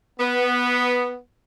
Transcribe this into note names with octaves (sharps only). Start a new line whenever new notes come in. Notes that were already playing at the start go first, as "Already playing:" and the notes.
B3